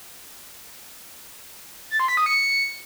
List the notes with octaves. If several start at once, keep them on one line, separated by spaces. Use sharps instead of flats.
A6
C6
B6
D#6
C#7